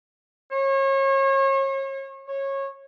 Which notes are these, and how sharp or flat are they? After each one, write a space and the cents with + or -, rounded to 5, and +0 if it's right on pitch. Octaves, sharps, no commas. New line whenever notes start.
C#5 -35
C#5 -20